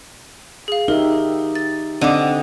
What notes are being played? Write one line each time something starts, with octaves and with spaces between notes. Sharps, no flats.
G#4 F5
D#4 G4 A#4 E5
A6
D3 C4 D5 D#5 D6 D#7